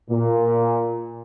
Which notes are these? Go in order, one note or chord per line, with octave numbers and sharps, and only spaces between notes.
A#2